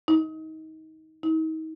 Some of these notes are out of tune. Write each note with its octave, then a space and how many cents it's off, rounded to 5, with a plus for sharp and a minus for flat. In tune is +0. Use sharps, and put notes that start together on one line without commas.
D#4 +25
D#4 +35